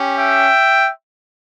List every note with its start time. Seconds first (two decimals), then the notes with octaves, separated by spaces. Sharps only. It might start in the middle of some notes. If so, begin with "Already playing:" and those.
Already playing: C#4 G4
0.17 E5 G5